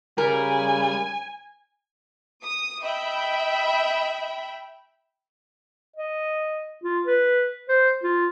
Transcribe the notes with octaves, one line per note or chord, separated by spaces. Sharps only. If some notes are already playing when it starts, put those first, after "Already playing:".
C#3 G3 A#4 G#5
D#6
D#5 E5 G5 B5
D#5
F4
B4
C5
F4